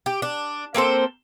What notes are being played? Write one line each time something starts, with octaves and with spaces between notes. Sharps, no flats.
G4
D4
A#3 C4 A4 C5